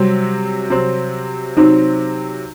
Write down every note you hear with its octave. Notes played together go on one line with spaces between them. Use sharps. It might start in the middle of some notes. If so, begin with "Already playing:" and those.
Already playing: C3 F#3 G3 C4
C3 F#3 C4
C3 F#3 C4 D#4